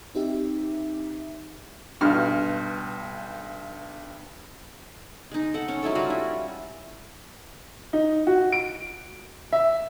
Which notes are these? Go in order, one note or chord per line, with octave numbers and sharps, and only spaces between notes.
C4 D#4 G4 E5
B1 G2 F6
G#3 D#4
A4 F#5
C#4
F#3 G#3 E4 A4
G3 F4 F#4
E4
D#4
F#4
D7
E5